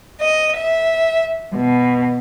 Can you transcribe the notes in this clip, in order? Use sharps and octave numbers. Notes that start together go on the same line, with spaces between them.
D#5
E5
B2